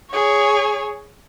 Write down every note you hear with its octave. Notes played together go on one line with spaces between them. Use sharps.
G#4 C#5